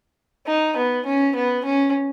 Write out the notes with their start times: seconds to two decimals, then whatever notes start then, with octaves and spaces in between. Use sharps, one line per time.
0.47 D#4
0.76 B3
1.06 C#4
1.35 B3
1.65 C#4